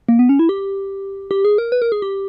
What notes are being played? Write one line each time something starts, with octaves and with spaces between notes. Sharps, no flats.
A#3
B3
C#4
E4
G4
G4
G#4
A#4
B4
A#4
G#4
G4